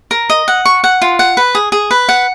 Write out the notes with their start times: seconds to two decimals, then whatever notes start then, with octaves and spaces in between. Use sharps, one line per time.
0.11 A#4
0.30 D#5
0.48 F#5
0.66 C#6
0.84 F#5
1.02 F4
1.19 F#5
1.37 B4
1.55 G#4
1.72 G#4
1.91 B4
2.09 F#5